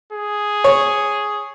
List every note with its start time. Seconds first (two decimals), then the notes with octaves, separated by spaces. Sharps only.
0.13 G#4
0.64 C#5